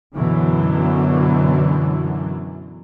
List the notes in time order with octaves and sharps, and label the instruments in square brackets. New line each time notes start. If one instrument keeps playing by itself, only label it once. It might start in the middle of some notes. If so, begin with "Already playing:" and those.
[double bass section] F#2 B2 D3 E3 F#3